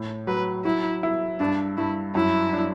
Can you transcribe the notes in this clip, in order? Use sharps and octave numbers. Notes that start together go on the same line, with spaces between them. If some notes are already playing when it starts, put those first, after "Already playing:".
Already playing: A2
F#3 B4
F#3 E4
E4
G2 D4
G2 E4
F#2 E4
D4